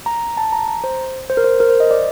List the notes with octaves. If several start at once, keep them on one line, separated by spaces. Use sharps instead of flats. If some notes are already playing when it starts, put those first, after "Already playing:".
A#5
A5
A#5
A#5
C5
C5
A#4
C5
A#4
C5
D#5
D5